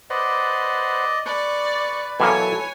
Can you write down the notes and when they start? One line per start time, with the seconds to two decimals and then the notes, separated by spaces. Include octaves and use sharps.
0.10 B4 C5 D5 D#5 F#5
1.26 B4 D5 C#6
2.20 B2 E3 F#3 A#3 E4 A4 C#5 G#5